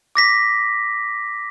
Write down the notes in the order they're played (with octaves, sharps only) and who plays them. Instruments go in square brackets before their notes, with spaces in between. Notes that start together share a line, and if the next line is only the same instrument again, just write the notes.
[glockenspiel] D6 A#6 B6